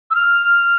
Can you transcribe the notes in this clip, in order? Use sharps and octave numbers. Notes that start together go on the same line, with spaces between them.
E6
F6